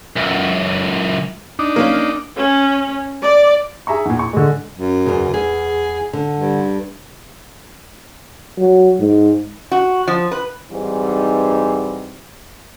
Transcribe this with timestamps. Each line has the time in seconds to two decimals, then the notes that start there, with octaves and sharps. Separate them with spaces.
0.17 C#2 F#2
1.59 D4 D#4
1.76 A#3 C#4
2.38 C#4
3.22 D5
3.87 G#4 E5 A#5 C#6
4.05 E2 A#2
4.19 C#6
4.33 D3 G#3
4.78 F#2
5.06 E2 C#3
5.34 E2 G#4
6.13 D3
6.40 G2
8.59 F#3
9.00 G#2
9.72 F#4
10.08 F3
10.32 B4
10.70 G#2 E3 G3 C4 D#4